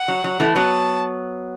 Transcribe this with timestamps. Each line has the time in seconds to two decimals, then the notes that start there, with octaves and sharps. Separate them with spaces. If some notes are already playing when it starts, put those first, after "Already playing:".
Already playing: F#5
0.08 F#3
0.24 F#3
0.40 E3 A3
0.56 F#3 B3 A5